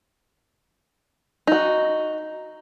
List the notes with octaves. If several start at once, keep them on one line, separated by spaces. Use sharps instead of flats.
D#4 F#4